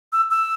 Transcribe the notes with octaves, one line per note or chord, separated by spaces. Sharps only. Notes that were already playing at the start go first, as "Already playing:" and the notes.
E6
E6